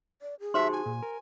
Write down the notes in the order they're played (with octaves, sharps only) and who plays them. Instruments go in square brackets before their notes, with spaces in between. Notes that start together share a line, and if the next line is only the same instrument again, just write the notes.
[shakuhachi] D5
G#4
[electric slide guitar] D#4 F#4 A5 [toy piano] G4 C5 C6 [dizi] E5
[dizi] G#5
[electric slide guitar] A#2
A#4